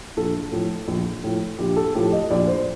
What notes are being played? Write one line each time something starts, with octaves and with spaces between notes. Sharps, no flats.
A#1 A4
A2 F3
A#1
A2 F3
A#1 G4
A4
A2 F3 G4
D#5
A#1 D5
C5